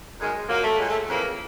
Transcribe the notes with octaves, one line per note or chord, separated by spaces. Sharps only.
F#2 D#3 G#3
A#2 F#3 A#3
A3
A#2 F#3 G#3
A3
F2 C#3 E3 A#3